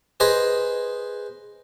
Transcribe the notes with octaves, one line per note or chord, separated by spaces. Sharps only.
G#4 B4 C5 D#5